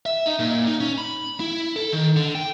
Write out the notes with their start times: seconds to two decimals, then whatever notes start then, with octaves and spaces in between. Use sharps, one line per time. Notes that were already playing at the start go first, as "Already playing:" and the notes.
0.06 E5
0.26 D#4
0.39 A#2
0.67 D#4
0.80 C#4
0.98 B5
1.40 E4
1.76 A4
1.93 D#3
2.16 D3
2.35 G5